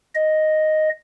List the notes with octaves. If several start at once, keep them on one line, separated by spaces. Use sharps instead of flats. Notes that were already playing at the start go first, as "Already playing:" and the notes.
D#5